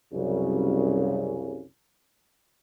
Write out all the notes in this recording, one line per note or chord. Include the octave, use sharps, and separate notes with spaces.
C2 F#2 C#3